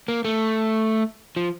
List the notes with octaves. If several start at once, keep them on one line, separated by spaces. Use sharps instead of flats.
A#3
A3
F3